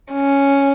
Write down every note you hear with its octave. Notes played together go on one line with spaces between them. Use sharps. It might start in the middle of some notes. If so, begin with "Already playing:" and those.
C#4